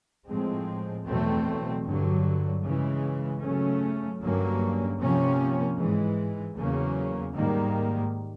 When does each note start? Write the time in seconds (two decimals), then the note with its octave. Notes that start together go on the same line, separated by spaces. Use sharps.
0.28 A2 F3 G#3 C4
1.07 E2 B2 F#3 A3 C4
1.86 G2 D3 F#3
2.64 C#3 E3 G#3
3.42 C#3 F#3 A3 C#4
4.21 G2 D3 F#3 A#3 C#4
4.99 C3 F3 A#3 C#4
5.77 G#2 E3 G#3
6.56 E2 C#3 F#3 A#3 C#4
7.34 G#2 D#3 G3 A#3